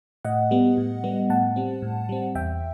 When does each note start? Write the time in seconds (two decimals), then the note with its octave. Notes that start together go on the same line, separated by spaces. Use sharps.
0.25 A2 D#5 F#5
0.51 G3 B3
0.78 A2
1.04 G3 B3
1.30 A2 F#5 A5
1.56 G3 C4
1.82 A2
2.09 G3 C4
2.35 E2 E5 G5